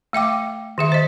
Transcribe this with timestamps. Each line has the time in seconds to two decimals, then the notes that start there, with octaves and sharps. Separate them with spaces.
0.13 A3 E5 G5 D6
0.78 D#3 G#4 E5
0.92 C5 D#5